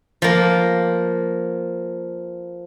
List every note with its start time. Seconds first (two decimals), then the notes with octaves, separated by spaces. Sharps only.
0.22 F3 A#3